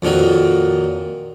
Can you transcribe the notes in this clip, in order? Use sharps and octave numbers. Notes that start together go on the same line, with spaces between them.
F2 A#2 D#3 F#3